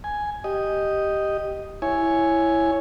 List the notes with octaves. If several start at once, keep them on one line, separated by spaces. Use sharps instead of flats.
G#5
G4 D#5
E4 C#5 G#5